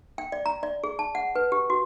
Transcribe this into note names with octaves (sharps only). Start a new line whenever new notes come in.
G5
D5
A#5
D5
G#4
A5
F#5
B4
G4
F#4